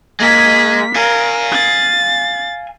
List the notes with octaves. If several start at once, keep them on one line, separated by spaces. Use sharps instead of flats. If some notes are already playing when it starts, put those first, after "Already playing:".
G#3 A#3 G#4 B6
A#4 F5 G#5
A6